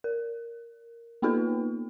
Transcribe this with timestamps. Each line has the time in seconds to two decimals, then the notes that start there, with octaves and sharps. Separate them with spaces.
0.04 A#4
1.22 A#3 B3 D#4 F4 A4 B4